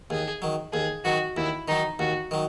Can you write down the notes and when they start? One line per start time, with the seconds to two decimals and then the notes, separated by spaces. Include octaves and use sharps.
0.10 D#2 G#4
0.42 D#3 F#3
0.73 D#2 G#4
1.05 D#3 F#3 F#4
1.37 D#2 E4
1.68 D#3 F#3 D#4
1.99 D#2 F#4
2.31 D#3 F#3